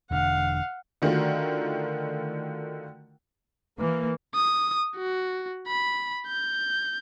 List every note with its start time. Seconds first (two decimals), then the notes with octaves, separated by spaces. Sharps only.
0.11 E1 D3 F5 F#5
1.02 D3 D#3 A3 F4 F#4 A#4
3.79 E3 A#3
4.35 D#6
4.96 F#4
5.68 B5
6.28 G6